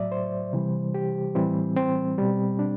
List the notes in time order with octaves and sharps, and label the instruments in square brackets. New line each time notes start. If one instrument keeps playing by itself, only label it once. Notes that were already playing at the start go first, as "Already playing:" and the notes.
Already playing: [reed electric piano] A2 F#3 D5 E5
C5
C3 E3 G3
G4
A2 E3 G3 C4
C4
B2 G3
D4